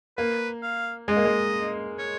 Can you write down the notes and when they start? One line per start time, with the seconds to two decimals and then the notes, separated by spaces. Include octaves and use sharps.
0.17 A#3 B4
0.62 F5
1.08 G#3 D#5
1.17 A#3
1.25 G#3
1.98 C#5